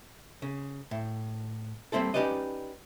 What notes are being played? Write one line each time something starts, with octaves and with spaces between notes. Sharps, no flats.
C#3
A2
G3 A#3 C4 E4 A4
C#4 D#4 G4 B4 D5 D#5